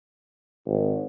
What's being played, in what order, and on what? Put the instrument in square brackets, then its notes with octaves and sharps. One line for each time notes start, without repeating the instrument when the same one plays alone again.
[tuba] G#1